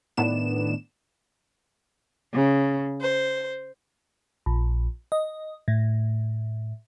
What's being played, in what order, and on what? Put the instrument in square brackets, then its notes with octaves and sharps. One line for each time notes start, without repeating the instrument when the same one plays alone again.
[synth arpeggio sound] A2 D#3 B3 D4 E7
[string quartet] C#3
C5
[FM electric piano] A#1
D#5
A2